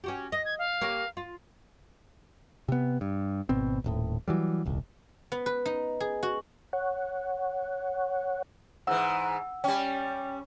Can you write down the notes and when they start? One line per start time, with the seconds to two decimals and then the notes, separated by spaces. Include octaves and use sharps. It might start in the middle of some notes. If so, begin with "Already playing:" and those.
0.04 C#4 F#4 G4
0.32 D#5 A#6
0.45 G#6
0.59 F5
0.81 A#3 G4 C#5
1.17 F4
2.69 C3 B3
3.01 G2
3.49 G#1 B2 C4
3.84 D#1 A1 A2
4.28 E3 F#3 G3
4.66 D#1 C2
5.32 B3
5.46 B4
5.66 D#4
6.00 G#4
6.23 F#4
6.73 C#5 F#5
8.87 G#2 E3 F#5 E6
9.64 G3 C#4 G5